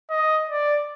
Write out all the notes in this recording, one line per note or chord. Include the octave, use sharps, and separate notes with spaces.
D#5
D5